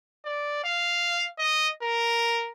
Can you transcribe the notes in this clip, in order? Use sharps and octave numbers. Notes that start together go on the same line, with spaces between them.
D5
F5
D#5
A#4